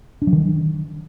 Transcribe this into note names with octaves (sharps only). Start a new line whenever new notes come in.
D4
F#3
D#3